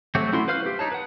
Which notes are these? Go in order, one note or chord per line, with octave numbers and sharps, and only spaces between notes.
F#3 A3 C4 F#4 G4
A3 C#4 E4 F#4 C6
B4 C5 F5 F6
G4
D#4 C#5 A5
B4 F#5